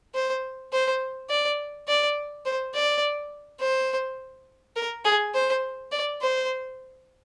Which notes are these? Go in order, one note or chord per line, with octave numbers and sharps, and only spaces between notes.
C5
C5
D5
D5
C5
D5
C5
A#4
G#4
C5
D5
C5